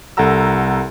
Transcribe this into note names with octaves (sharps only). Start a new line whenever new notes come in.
C2 A4 F#5 A#5 E6